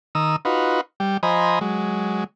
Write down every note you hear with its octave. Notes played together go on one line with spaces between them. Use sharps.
D#3 A#5 D#6 E6
D#4 F4 F#4 B4
G3 G5
F3 C5 D#5 G#5 A#5 B5
F#3 G#3